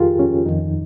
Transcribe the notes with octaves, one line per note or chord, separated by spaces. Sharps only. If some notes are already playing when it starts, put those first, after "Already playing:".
Already playing: F2 D#3 F4 G4 G#4 A#4
C#4
F2 D#3 D#4